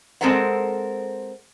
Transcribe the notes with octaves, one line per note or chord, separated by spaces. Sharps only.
G#3 C4 A4 A#4 C5 F#5